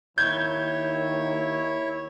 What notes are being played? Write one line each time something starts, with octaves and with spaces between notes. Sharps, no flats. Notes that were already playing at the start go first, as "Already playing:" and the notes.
D#2 D#3 E4 C#5 G6 G#6